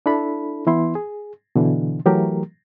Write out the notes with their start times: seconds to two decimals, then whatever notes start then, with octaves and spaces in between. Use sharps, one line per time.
0.06 D4 E4 A4 B5
0.67 E3 B3 E4 C6
0.95 G#4
1.56 B2 D3 E3
2.06 E3 F#3 A3 G4 A#4